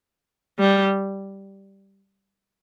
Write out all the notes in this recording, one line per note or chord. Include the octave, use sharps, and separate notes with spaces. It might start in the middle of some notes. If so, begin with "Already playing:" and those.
G3